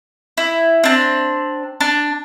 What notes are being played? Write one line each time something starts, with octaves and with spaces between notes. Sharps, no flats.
E4
C4 D4
D4